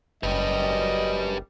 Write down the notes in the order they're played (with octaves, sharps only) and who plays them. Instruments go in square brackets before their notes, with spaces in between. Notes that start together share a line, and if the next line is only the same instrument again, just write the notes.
[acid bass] F#1 [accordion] F#2 G3 [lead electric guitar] G4 B4 [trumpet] D#5